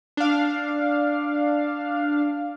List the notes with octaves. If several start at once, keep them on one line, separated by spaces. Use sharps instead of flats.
D4 F5